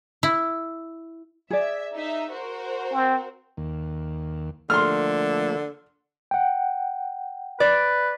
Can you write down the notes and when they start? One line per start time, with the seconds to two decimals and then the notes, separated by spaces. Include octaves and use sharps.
0.23 E4
1.50 G#4 D5 E5
1.94 D#4 E5
2.31 F#4 A#4 C5
2.93 C4
3.57 D#2
4.70 D3 F3 A3 A#3 C6 F6
6.31 F#5 G5
7.60 B4 D5